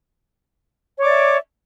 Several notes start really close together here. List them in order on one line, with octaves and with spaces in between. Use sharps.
C#5 D6 D5 E5